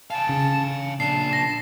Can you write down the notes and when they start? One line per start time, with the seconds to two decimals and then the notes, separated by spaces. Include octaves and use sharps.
0.10 F5 G#5 A5
0.29 C#3
1.00 A#2 D4 A5 C7
1.33 A#6